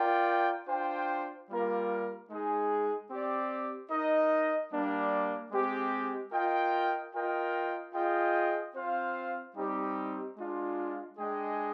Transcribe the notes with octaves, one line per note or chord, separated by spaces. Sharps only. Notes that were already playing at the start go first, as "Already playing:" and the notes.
Already playing: F4 A#4 D5 G5
D4 F4 C5 G5
G3 A#3 F4 A#4
G#3 D#4 G#4
C4 G4 D5
D#4 A#4 D#5
G3 A#3 D4
G#3 C4 G4
F4 A#4 D#5 G5
F4 A#4 D#5 G5
F4 G#4 D#5 G5
C4 F4 C5 F5
G3 C4 D#4 G4
G#3 D4 F4
G#3 D4 G#4 D#5 G5